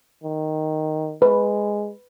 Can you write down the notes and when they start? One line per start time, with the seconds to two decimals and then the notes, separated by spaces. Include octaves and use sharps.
0.23 D#3
1.22 G#3 B4